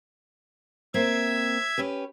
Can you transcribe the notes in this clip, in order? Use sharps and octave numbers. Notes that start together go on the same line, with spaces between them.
A#3 C4 C5 E5 G#6
C#4 G4 B4